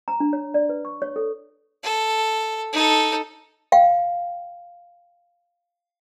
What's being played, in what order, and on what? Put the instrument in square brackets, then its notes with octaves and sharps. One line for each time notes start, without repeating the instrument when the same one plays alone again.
[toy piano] A#5
D4
C#5
D5
B4
C#6
C#5
A4
[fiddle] A4
D#4 A4
[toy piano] F5 G5